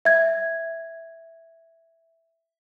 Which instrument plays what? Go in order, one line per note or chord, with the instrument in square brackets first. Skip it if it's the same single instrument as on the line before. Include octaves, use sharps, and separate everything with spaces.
[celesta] E5 G#6